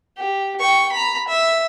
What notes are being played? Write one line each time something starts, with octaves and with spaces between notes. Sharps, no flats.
G4
G5 C#6
A#5 B5
E5